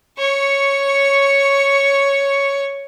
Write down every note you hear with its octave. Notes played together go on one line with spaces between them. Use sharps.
C#5 C#6